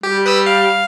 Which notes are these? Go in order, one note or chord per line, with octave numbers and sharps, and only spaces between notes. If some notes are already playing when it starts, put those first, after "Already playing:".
G3 G4
B4 D#6 E6
F5